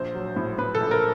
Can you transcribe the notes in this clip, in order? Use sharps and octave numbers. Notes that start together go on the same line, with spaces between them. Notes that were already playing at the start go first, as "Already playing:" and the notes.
Already playing: A#1 C5
F#3
A2
A2 B4
A4
A#1
A#4